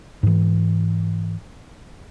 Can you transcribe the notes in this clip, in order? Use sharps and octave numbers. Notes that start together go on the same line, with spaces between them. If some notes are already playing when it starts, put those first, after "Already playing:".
G#2 E3